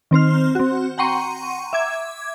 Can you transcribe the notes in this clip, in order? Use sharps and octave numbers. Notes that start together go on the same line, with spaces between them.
D#3 C4 C5 F6
C4 F#4
F#5 G5 A#5 C6 C#6 D#7
E5 D6 G#6